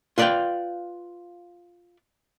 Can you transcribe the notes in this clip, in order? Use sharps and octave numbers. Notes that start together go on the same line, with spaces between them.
F4 B4 D5 D#5 F5 G5